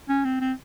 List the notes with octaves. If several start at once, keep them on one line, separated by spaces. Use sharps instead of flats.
C#4
C4
C4